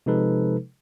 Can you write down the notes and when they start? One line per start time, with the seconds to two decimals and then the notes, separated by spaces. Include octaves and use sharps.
0.06 C3 F3 G#3 D#4 A4 B4